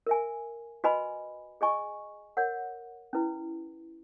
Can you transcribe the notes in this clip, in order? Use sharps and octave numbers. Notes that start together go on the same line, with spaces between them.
A#4 E5 G#5
F#4 B4 D#5 G#5 B5
G#4 D#5 G#5 C#6
A#4 C#5 F#5
C#4 E4 B4